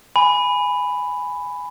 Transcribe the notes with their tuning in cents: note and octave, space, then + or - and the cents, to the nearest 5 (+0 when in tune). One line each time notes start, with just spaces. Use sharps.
G#5 +0 B5 +5